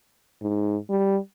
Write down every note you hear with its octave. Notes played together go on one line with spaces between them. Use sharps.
G#2
G3